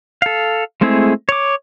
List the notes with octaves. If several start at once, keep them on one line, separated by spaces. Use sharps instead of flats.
A4 F5
G#3 A3 C4 E4 G#4
C#5 D6